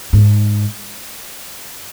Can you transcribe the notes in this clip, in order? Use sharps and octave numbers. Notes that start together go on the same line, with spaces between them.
G#2